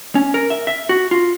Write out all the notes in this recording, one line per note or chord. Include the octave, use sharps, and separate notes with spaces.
C#4
A#4
E5
E5
F#4
F4